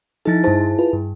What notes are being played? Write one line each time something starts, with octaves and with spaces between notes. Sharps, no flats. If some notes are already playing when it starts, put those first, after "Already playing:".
F3 D#4 E4 A4 A6
G2 E4 G#4 C5 A5
F4 B4
G2